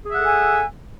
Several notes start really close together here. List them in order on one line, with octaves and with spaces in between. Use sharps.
G#4 E5 F#5 A4 G#5